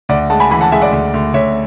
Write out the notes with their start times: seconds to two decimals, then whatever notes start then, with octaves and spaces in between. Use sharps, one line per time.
0.09 D2 D5 F#5
0.30 G#3 F#5 A5
0.40 G#5 B5
0.51 E3 G#5 B5
0.61 F#5 A5
0.72 G#3 E5 G#5
0.81 D5 F#5
0.92 D2
1.14 D2
1.34 D2 C#5 E5